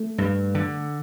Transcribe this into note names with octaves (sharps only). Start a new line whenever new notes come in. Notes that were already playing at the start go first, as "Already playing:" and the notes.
Already playing: A3
G2
D3